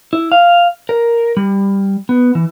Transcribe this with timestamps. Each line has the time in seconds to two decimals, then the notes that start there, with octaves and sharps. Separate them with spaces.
0.13 E4
0.32 F5
0.89 A#4
1.37 G3
2.09 B3
2.35 E3